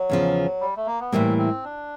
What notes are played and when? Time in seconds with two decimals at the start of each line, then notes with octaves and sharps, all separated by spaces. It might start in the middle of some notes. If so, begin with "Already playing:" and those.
Already playing: F#3
0.10 E2 C#3 F3
0.61 G3
0.77 A3
0.86 A#3
1.00 B3
1.12 A2 E3 G3 A#3 C4
1.38 C4
1.64 D4